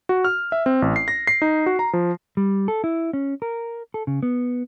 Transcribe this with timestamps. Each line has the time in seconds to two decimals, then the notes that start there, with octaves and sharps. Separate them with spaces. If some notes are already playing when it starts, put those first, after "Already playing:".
0.09 F#4
0.25 F6
0.52 E5
0.66 C4
0.82 A1
0.96 C7
1.08 A#6
1.27 C7
1.42 D#4
1.66 F#4
1.79 A#5
1.93 F3
2.37 G3
2.68 A4
2.84 E4
3.13 C#4
3.42 A#4
3.94 A4
4.07 C#3
4.23 B3